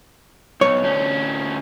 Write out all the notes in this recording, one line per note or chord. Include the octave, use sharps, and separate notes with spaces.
B1 C#5
D2 C#4